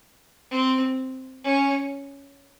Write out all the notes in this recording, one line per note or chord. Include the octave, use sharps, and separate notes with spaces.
C4
C#4